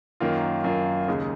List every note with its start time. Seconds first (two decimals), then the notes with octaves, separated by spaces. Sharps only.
0.20 F#2 D#3 A#3 F4
0.64 F#2 D#3 A#3 F4
1.08 D#2 C#3 G#3 D#4